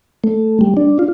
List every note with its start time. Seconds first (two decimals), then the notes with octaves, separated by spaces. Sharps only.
0.24 A3
0.61 G3
0.77 D4
0.99 F4